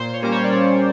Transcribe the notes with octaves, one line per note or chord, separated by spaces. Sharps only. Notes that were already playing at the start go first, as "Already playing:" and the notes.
Already playing: A#2 C5
C#5
G3 A#3 C#4 C5
C#5
D5
A#2 C#5